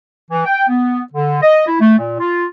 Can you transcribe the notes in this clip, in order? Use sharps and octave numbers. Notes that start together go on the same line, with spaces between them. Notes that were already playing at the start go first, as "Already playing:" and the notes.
E3
G5
B3
D3
D#5
E4
A3
A#2
F4